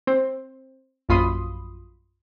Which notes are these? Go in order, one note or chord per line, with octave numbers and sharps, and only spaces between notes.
C4 C5
A#1 F#2 F4 B5 C6 D#6